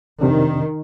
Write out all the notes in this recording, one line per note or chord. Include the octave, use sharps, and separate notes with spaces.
F2 C3 D#3 D4